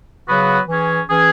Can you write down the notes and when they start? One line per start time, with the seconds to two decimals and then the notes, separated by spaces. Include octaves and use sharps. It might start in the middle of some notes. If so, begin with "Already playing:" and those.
0.28 C#3 F#3 B3 F#4 B4
0.68 E3 C#4 G#4
1.08 E3 C#4 G#4